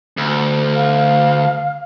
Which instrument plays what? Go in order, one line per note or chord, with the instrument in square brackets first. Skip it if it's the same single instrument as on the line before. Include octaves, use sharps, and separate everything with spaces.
[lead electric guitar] D2
[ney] F5